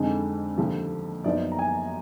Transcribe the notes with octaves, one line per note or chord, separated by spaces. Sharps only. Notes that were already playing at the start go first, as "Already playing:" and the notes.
Already playing: F2 D3 G#3 D#4
D#2 D3 F3
F#2 F3 B3 D#4 D5
A#5
G#5